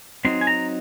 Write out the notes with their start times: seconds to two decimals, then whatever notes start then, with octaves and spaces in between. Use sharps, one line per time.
0.25 F#3 C4 D#4 C6
0.41 G#5
0.47 A#5